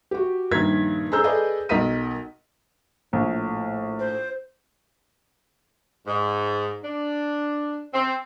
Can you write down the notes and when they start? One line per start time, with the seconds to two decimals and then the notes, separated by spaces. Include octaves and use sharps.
0.11 F#4 G4
0.51 A#1 G2 D#3 A#4 G#6 B6
1.12 G#4 A4 C5 A#5 E6 G6
1.24 G#4 A4 B4 D5 D#5
1.69 B1 A#4 D#5 B6 D#7
3.13 A#1 A2
3.99 C5
6.07 G#2
6.83 D4
7.94 C4